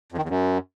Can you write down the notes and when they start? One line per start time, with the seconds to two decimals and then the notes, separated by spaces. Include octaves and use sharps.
0.12 F2
0.18 D#3
0.23 E2
0.29 F#2